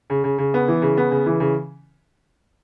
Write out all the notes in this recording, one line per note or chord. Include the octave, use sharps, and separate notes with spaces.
C#3
C#3
C#3
B3
E3
C#3
B3
C#3
E3
C#3